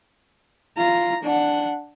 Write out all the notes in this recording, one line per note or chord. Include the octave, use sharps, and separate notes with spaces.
F4 A#5
D4 F#5